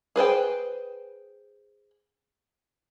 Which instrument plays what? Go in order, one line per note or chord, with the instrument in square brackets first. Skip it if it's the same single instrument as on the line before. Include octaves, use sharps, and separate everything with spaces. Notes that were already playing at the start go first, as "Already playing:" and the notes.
[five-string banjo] G#4 B4 C5 G5